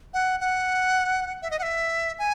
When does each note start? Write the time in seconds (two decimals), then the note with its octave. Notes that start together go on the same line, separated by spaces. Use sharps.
0.14 F#5
0.40 F#5
1.42 E5
1.51 D#5
1.59 F#5
1.63 E5
2.19 G#5